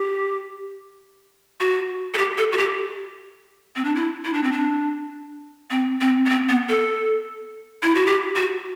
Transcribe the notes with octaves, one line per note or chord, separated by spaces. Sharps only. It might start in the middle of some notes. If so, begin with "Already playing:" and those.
Already playing: G4
F#4
A4
G4
A4
F#4
G4
C4
D4
E4
E4
D4
C4
D4
C4
C4
B3
C4
B3
A4
E4
F#4
G4
F#4